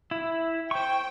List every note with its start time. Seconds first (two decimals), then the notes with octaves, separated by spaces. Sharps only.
0.11 E4
0.71 C5 G5 C#6